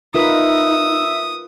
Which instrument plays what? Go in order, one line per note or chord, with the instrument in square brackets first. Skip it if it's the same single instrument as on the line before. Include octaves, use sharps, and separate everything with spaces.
[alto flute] D#4 [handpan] F4 A#4 B4 [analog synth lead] E5 [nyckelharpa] D#6